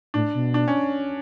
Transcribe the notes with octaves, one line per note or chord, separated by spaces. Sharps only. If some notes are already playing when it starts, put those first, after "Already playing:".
A2 D4
B2
D4
C#4